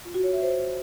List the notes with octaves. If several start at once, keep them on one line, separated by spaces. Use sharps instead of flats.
F4
F#4
C#5
E5
C5